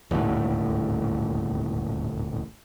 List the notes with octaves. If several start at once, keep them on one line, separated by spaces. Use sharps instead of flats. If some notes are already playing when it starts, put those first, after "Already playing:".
D#1 G#1 D2 A2